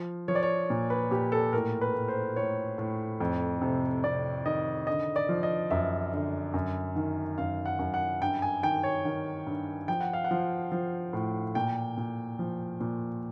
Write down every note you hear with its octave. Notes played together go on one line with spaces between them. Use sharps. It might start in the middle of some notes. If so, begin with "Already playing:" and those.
Already playing: F3
F3 C#5
D5
C#5
A#2
B4
A#2 G4
A4
A2 A#4
B4
A2
C5
A2 C#5
A2
F2
C3
C3 D5
D#3 D#5
D3 D#5
D5
F3
D#5
F#2 E5
D3
F#2
D#3
F#2 F5
F#5
F#2
F#5
G2 G5
G#5
D#3 G5
C#5
D#3
G2
F3 G5
F#5
F5
F#5
F3
F3
A2
A#2 G5
A#2
F3
A#2